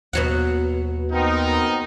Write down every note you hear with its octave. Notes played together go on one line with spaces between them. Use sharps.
D#2 B2 F#3 F#5
B3 C4 D#4 A#4